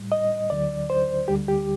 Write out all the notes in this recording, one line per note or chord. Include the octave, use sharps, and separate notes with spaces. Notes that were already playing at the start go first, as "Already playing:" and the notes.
Already playing: A2 G3
D#5
D2 D3 F#3 D5
C5
D2 D3 G3 G4
G4